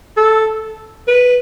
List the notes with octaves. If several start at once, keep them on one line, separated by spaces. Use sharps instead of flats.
A4
B4